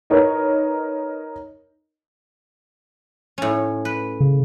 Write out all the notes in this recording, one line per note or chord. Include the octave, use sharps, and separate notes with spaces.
D#4 A#4 B4 C#5 D#5
A2 C#4
B4
C#3